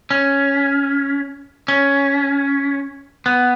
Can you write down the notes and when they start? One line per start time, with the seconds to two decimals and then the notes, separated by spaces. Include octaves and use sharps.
0.11 C#4
1.68 C#4
3.26 B3